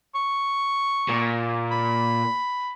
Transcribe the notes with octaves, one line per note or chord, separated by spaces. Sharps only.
C#6
A#2
B5